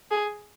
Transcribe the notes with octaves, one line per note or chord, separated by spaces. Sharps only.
G#4